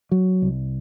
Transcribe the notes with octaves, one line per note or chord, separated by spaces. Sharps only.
F#3
C2